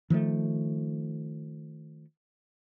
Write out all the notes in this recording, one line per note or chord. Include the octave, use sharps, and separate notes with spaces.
D#3 F3 G3 A3